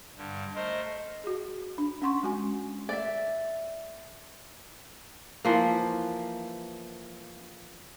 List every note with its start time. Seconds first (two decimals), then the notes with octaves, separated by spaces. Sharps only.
0.17 G2 D3
0.55 A3 A#4 C5 D#5
1.24 F#4 G#4
1.78 D4
2.02 C#4 F#5 C6 C#6
2.23 G#3 F#4 G#5
2.89 D5 E5
5.45 E3 F3 A#3